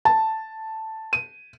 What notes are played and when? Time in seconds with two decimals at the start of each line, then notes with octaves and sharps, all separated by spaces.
0.05 A5
1.13 D#7